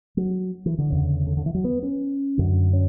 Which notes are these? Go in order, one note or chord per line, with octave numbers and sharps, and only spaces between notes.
F#3
E3
D3
E2 C#3
D3
D3
E3
F#3
B3
C#4
F#2 D3
C#4